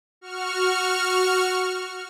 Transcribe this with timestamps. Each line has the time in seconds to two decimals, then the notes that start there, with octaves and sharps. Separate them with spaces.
0.21 F#4 C#6 F6